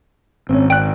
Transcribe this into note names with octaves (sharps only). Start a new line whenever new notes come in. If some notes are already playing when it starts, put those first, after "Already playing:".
G#1 C4 C#4
D5 G5 F#6